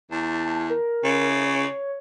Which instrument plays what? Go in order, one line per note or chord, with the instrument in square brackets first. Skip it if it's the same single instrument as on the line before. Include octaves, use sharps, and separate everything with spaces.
[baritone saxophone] E2 [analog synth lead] A5
[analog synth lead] A#4
[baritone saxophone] C#3
[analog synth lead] C#5